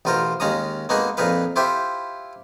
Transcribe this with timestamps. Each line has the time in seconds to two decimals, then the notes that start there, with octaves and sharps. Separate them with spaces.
0.05 A1 B2 F4 A#4 C5 A#5
0.40 D#2 G#3 C#4 F5 A#5 D#6
0.89 G#3 A#3 B3 D#4 F#4 G#4
1.17 F2 A#2 D#4 G#4 B4 F5
1.56 E4 F4 G4 C5 E5